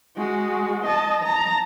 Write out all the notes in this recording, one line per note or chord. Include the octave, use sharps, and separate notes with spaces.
G#3 F#4
D#5 A5
A5 A#5